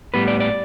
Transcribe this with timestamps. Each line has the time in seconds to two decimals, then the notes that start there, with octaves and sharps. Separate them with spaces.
0.14 A2 G3 B3 B4
0.28 D5
0.40 D5